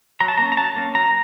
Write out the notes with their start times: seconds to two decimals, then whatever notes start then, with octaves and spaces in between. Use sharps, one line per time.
0.20 F#3 A#5
0.28 A5
0.38 A#3 C#4 A#5
0.52 A#5
0.57 F#3 A5
0.76 A#3 C#4
0.95 F#3 A#5